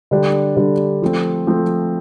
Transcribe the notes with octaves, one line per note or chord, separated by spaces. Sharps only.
D3 G3 D4 G4
D3 G3 D4 G4
F3 A3 C4
F3 A3 C4